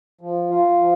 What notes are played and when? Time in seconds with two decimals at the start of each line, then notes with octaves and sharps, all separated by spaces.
0.21 F3
0.51 F4
0.80 F3